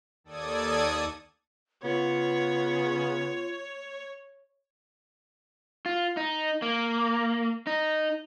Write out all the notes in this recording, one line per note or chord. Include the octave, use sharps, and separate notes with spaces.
D#2 A4 D5 D#6 G#6
C#3 B3 F4 C#5
F4
D#4
A#3
D#4